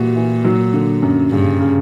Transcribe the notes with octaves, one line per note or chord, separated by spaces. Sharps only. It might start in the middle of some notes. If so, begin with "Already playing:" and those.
Already playing: A#2 E3 G3 F#4
E3
F#3
D3
F#2
G2 C#3
C#3